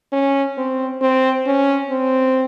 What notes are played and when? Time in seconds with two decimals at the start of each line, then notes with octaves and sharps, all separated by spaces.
0.12 C#4
0.57 C4
1.01 C4
1.46 C#4
1.90 C4